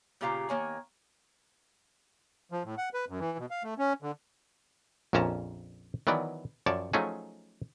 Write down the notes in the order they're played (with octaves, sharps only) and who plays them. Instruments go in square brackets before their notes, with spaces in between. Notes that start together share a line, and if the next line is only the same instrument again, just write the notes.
[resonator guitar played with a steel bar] A#2 C#3 F4 G4 F5 A#5
D#3 A#3 C#5 G#5
[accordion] F3
A2
F#5
B4
F#2
E3
B2
F5
A3
C#4
D3
[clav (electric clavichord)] A#1 F2 A#2 C#4 A5 A#5
D#3 E3 F#3 B3 D5
F#2 F3 C#5 D5 A5
F3 F#3 A3 C#4 D#4 G#4